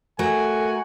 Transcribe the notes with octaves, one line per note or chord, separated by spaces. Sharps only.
A3 F#4 A4 A#4 G#5